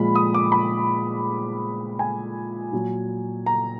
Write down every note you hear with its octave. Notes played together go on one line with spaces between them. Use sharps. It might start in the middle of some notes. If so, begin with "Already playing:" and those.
Already playing: A#2 F3 G#3 B5
D#6
D6
B5
G#5
A#2 F#3
A#5